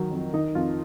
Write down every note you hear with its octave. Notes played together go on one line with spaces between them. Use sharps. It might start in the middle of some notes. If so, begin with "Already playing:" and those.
Already playing: D#3 F#3
F2
D#3 D#4
F2 F4